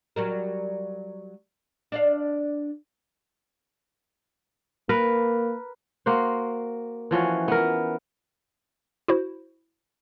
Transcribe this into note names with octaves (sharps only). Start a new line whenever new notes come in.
F#3 G3 A#4
D4 D5 F5
A#3 A#4 B4
A#3 F#4 C5
E3 F3 C#4 F#4
B3 A#4
E4 F#4 C5